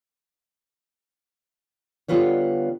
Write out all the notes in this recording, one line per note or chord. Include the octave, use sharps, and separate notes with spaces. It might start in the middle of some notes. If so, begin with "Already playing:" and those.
D3 G3 B3 F4 B4 C#5